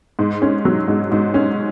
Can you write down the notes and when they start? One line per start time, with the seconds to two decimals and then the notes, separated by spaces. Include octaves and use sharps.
0.19 G#2
0.42 C#4
0.65 F#3
0.88 G#2
1.12 G#2
1.34 C#4